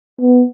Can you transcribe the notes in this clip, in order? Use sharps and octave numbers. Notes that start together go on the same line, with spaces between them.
B3